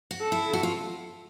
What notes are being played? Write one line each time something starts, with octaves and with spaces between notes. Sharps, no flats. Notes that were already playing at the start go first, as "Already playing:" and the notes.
F#4
A4
E4
F#4
F4